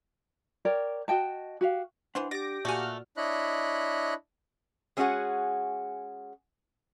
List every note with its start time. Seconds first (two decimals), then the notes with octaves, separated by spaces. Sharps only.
0.65 A#4 C#5 D5 G5
1.08 F#4 D#5 G5 A5
1.61 F#4 G4 F5
2.15 E3 D4 C5 F#5 C6
2.31 G4 D5 D6 A#6
2.65 A#2 A3 F#4 D5 G#5 F6
3.17 D4 E4 C#5 D#5 B5 F#6
4.97 G#3 C#4 E4 F#4 G#4 F#5